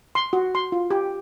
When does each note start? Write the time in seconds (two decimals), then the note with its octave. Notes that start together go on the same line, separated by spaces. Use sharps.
0.15 C6
0.33 F#4
0.55 C6
0.72 F4
0.91 G4